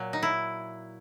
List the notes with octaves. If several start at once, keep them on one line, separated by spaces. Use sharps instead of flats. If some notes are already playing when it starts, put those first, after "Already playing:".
Already playing: A#2 F#3
D#4
E4